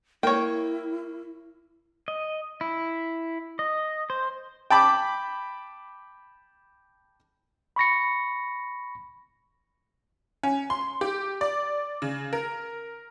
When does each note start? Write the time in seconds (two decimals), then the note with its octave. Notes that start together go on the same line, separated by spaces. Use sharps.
0.23 A#3 E4 C#5 G5
2.08 D#5
2.61 E4
3.59 D#5
4.10 C5
4.70 G5 A5 B5 D6
7.76 B5 C#6 A#6 C#7
10.43 C#4
10.70 C6
11.01 G4
11.41 D5
12.02 C#3
12.33 A#4